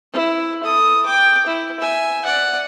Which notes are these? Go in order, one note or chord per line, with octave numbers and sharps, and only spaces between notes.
E4
A4 D#6
G5 D6
E4
E5 G#5
D5 F#5